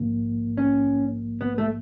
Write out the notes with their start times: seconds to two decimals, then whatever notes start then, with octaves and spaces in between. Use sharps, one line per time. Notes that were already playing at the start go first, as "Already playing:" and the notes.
Already playing: A#1 G#2 F3 A#3
0.57 C#4
1.41 B3
1.58 A3